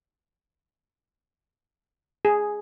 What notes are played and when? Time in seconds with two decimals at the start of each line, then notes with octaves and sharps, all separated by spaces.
2.25 G#4